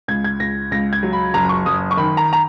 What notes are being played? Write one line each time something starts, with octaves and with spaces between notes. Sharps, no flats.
C#2 G#6
G#6
C#2 A#6
C#2 A#6
G#6
F#3
B5
F#1 A#5
C#6
F#1 D#6
C#6
D#3 B5
A#5
A#5